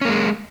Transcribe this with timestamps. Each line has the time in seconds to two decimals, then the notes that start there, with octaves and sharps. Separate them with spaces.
0.01 C#4
0.05 A#3
0.09 G#3